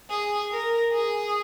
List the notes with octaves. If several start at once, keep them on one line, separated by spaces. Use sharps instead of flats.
G#4
A#4
G#4